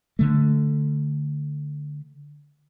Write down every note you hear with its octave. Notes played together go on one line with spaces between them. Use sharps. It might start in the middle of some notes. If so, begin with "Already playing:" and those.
D3 A3